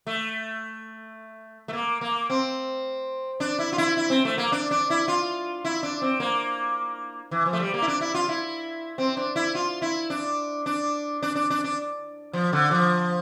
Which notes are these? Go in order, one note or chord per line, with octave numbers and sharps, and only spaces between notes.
A3
A3
A#3
A#3
C4
D4
E4
F4
E4
E4
C4
A3
A#3
D4
D4
E4
F4
E4
D4
C4
A#3
E3
F3
A3
G3
A#3
E4
D4
E4
F4
E4
C4
D4
E4
F4
E4
D4
D4
D4
D4
D4
D4
F3
D3
F3